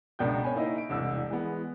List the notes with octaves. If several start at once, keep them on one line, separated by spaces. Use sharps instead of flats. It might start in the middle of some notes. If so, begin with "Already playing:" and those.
C#2 B2 D4 A#4 G5 G6
C#5 G#5 B5
A#3 D#4 E4 A#4 D#5
D7
E1 C2 E6
E3 G#3 B3